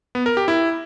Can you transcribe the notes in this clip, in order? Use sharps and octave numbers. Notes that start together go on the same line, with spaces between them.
B3
A#4
G4
E4